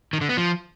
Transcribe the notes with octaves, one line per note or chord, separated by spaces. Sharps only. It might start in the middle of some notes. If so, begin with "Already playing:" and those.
D#3
D3
B3
F3